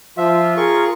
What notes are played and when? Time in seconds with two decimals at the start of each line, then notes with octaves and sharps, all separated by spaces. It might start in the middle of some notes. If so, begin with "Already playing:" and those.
0.18 F3 F4 E5
0.57 G#4 A#4 C#6